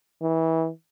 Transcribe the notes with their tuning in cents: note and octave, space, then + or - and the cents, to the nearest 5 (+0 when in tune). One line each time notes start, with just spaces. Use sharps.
E3 -25